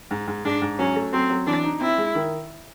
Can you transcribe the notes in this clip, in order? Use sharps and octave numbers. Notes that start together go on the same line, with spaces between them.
G#2
G#2
G#2 D4
G#2
F#3 C#4
A3
F#3 C4
F#3
E3 D4
D#4
C4 E4
G#3
D#3